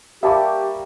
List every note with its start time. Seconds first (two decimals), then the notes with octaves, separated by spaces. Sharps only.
0.23 G3 A#3 G4 E5 A5 C#6